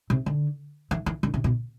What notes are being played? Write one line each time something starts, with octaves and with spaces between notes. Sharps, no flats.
C3
D3
E3
E3
D3
C3
B2